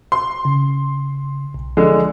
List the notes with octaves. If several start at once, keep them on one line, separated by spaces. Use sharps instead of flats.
C6
C#3
B1
D3 F3 G#3